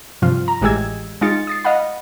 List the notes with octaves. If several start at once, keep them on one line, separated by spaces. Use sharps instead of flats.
G2 C3 F3 F4 F6
A#5
A1 G#3 G4 G#4 E6 G#6
G#3 D#4 F4 A6 C#7
D#6 A6 C7
D#5 F5 F#5 B5